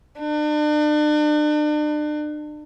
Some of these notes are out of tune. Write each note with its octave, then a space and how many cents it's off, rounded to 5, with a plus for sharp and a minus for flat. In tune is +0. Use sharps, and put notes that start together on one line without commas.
D4 +40